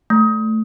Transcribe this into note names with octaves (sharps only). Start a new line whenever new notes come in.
A3